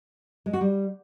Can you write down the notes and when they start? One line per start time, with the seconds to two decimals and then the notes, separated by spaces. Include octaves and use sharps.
0.46 G#3
0.53 F#4
0.61 G3